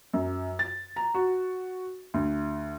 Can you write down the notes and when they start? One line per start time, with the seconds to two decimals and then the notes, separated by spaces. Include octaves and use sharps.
0.14 F#2
0.59 A6
0.96 A#5
1.14 F#4
2.14 D2